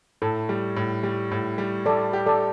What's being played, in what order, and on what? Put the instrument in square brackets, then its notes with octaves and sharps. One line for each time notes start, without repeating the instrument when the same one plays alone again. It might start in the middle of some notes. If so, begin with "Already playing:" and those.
[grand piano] A2 [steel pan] A4
[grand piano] G3
A2
G3
A2
G3
[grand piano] G3 [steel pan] A4 D5
[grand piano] G4
[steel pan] A4 D5